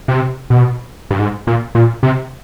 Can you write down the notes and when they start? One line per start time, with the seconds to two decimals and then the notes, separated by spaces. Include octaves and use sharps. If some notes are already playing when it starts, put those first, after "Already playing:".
0.08 C3
0.50 B2
1.11 G2
1.19 G#2
1.47 A#2
1.75 A#2
2.03 C3